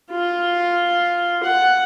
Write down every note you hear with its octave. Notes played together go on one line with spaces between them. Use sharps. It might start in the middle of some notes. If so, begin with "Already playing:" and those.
F4
F#5